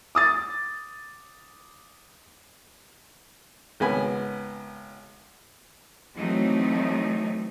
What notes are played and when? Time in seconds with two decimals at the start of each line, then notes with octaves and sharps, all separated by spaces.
0.15 D6 D#6 A6
3.80 G#1 C#3 B3 G#5 B5
6.16 E3 F#3 A3 C4 D#4